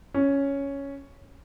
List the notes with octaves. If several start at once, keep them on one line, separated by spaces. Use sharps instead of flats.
C#4